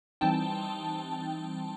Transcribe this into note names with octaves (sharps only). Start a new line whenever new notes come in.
E3 G3 C4 D#4 G5 A5